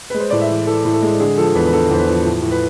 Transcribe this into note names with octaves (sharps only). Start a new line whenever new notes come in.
G#3 B4
C5
A2 D5
E5
E3
E3 A4
A2
A4
G#3
D3 G#4
F3 A4
E2 B4
B4
D3 A4
E2 C5
B4
F3
A2
A2
B4